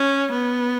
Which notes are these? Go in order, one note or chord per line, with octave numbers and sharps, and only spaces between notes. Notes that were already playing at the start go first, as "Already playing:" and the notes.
Already playing: C#4
B3